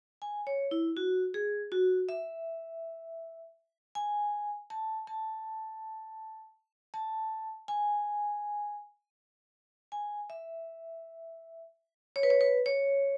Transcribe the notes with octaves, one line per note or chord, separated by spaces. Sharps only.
G#5
C#5
E4
F#4
G#4
F#4
E5
G#5
A5
A5
A5
G#5
G#5
E5
C#5
B4
C#5
B4
C#5